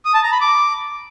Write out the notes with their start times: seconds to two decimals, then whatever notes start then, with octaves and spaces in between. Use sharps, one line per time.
0.05 D#6
0.14 A5
0.23 A#5
0.32 B5
0.41 D6